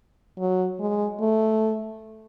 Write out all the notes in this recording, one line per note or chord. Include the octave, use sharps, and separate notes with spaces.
F#3
G#3
A3